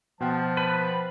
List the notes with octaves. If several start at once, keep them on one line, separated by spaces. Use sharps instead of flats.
B2 F3 F#5 G5 A5
B4